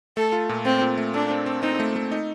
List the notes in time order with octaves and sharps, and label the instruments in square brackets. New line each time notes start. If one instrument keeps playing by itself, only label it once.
[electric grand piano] A3 [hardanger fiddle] A4
[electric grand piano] F4
A#2
[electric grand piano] A3 [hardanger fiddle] C4
[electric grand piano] A#2
A3
[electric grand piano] A3 [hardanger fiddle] D4
[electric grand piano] C4
C4
[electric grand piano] C4 [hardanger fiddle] D#4
[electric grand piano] A3
A3
D#4